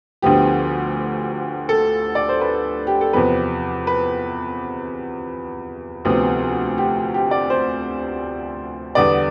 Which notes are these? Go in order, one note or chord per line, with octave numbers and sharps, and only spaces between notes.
D2 D3 F3 B3 G4
A4
D5
C5
B4
G4
A4
E2 C3 F3 B4
B4
D2 C3 F3 B3
G4
G4
D5
C5
E2 D3 G3 B3 D5